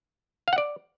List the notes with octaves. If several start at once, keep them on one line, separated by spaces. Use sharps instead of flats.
F5
F#5
D5